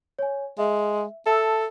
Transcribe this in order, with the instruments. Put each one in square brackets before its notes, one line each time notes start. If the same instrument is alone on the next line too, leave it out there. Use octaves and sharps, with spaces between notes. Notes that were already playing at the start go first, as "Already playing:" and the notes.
[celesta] C#5 G#5
[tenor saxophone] G#3 [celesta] E5
[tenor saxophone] A4 [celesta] E5 A5 E6